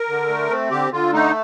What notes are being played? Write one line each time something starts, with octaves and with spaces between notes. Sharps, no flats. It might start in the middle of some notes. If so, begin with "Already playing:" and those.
Already playing: A#4
D3
A3
C4
D3 G4
D3 F4
A3 D#4